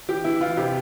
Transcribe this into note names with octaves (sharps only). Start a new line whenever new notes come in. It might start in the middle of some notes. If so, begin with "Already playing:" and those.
E3 G4
E3 E4
E3 F4
C3 G4